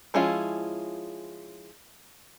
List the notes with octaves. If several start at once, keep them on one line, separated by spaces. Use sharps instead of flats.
F3 G#3 C#4 E4 F4